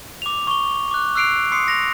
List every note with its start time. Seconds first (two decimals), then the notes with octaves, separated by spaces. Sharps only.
0.22 D6 F7
0.47 C#6 G7
0.91 D6 F#6
1.15 E6 F#6 C7 D7 F7
1.52 C6 D#6 C7 C#7
1.68 A#6 F7